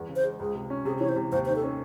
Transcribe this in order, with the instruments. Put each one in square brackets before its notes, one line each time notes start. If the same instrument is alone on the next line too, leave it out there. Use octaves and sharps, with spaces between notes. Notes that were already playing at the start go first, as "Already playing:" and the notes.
Already playing: [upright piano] E2
C#3
[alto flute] C5
[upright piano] G#3
[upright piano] C#2 [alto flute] G#4
[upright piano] C3
C#4
[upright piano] C3 [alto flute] G#4
[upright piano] E3 [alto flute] C#5
[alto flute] C5
[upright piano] C3
[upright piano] D#2 [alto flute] C5
[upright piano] D#3 [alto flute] C5
[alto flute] A4
[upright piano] C#4